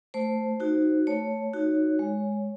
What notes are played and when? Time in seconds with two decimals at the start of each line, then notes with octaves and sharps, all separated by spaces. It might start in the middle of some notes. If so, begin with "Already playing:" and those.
0.14 A3 C5
0.60 D#4 F#4
1.07 A3 C#5
1.53 D#4 F#4
1.99 G#3